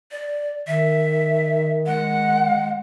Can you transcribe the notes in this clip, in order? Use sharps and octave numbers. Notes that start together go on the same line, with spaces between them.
D5
D#3 E5
G#3 F#5